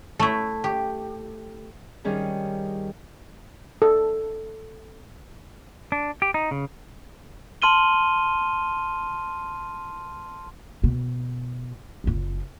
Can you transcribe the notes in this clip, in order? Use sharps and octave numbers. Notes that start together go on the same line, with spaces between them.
A3 E4
G4
D#3 G3 C#4 G#4
A4
D4
G4
D#4
C#3
A5 C6 F6 D#7 G7
B2
F#1 F4